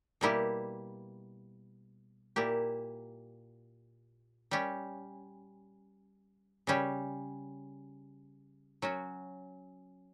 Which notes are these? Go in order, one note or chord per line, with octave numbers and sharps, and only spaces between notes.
B2 G3 A#3 E4 G4
A#2 A#3 E4 G4
G3 C#4 G4
C#3 G3 C#4 G4
F#3 C#4 F#4